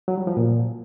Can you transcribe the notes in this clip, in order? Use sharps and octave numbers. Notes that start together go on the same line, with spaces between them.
F#3
G3
F3
A#2